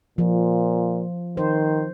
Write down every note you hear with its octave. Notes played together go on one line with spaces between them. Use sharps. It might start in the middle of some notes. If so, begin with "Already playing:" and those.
A#2 F3
D#3 C5